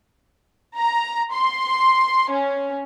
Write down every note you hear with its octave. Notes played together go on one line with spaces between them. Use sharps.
A#5
C6
C#4